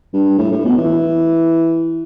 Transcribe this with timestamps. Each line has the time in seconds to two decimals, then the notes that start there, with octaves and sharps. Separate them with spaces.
0.13 G2
0.38 A2
0.52 A2
0.65 B2
0.77 E3